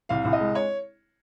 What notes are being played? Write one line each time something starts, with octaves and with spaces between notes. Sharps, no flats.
C2 F5
C2
D#5
G#3
C#5